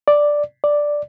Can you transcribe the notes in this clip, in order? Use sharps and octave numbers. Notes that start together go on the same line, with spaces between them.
D5
D5